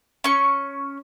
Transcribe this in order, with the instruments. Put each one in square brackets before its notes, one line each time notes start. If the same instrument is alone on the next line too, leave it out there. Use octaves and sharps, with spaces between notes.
[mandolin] C#4 C#6